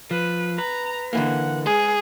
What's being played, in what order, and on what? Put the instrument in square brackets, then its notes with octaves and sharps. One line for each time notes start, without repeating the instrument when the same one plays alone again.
[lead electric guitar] F3 [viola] B4
[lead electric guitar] B4 [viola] A#5
[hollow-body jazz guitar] D3 E3 A#3 [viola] F#5
[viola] G#3 [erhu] G#4